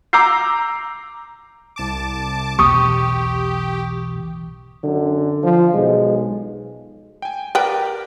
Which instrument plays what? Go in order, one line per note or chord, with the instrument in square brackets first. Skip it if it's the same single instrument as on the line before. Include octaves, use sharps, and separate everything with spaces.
[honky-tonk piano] A#5 D6 E6 G6 C7
[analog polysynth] C2 A5 D6
[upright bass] B1 E2 [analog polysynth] G4 [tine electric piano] C#6 D#6
[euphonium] F#2 [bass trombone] D3
[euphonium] F3
[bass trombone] B1 [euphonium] G#3
[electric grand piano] G5 G#5
[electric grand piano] G4 A#4 D5 [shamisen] B4 G5